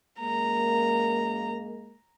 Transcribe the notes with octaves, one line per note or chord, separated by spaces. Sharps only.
F#2 G#3 A#3 A#5